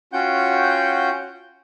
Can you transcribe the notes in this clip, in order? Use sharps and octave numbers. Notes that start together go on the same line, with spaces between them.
C#4 F4 F#4 F#5 G5 G6